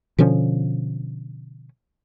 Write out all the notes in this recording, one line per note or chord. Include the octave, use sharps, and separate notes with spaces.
B2 D3 F3 C#4